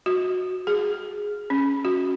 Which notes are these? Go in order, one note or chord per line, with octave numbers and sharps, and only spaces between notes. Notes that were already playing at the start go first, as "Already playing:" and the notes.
F#4
G#4
C#4
F#4